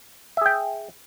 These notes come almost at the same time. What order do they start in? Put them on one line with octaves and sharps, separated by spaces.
E5 G#4 G5